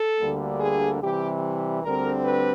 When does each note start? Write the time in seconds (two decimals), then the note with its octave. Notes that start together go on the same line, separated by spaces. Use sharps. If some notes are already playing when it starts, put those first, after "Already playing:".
Already playing: A4
0.19 D2 D3 G3 A#3
0.60 G#4
1.01 C3 E3 G3 G4
1.83 D2 D3 G3 C4 A#4
2.24 B4